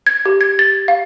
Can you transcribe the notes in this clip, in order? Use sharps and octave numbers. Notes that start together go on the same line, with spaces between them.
G#6
G4
G#6
A6
F5